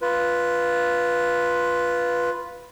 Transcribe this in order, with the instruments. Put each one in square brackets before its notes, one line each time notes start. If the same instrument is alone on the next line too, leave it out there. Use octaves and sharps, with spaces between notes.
[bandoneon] F4 B4